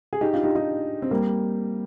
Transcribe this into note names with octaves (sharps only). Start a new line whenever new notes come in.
G#4
D#4 G4
D4 F4
D#4 G4
D#4 G4
C4
G3 A#3